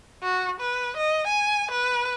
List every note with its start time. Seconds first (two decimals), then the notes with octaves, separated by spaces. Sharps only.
0.23 F#4
0.61 B4
0.97 D#5
1.27 G#5
1.72 B4